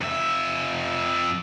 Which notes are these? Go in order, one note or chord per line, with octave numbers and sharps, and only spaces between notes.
F2 E5